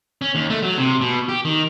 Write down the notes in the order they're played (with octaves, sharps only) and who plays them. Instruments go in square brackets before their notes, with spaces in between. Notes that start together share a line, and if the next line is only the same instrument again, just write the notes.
[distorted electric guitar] C#4
D#2
A3
F#3
C3
B2
G4
D#3